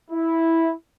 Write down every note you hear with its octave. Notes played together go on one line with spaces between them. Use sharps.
E4